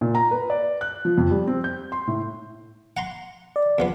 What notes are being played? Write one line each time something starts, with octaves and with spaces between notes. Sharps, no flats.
A#2
A#5
B4
D5
F#6
F3
F2
G3
C4
G6
C6
A2
F#5 A#5 C6
D5
E2 F3 B3